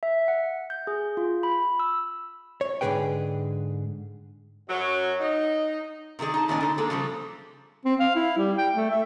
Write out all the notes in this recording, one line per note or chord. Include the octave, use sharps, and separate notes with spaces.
E5
F#5
G6
G#4
F4
B5
E6
C#5
G#2 D3 D#3 G#4 B4 G5
F#2 F#3
D#4
C3 D#3 A3 G#4 D5
D#4 A5
A#2 D#3 G#3 C#4 D5 G#5
D3 D#4
G#3 A#3 G#4 A4
C#3 F3 G3 C4
C4
F5
E4
G3
G5
A3
E5